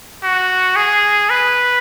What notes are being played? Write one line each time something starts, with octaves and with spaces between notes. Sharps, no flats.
F#4
G#4
B4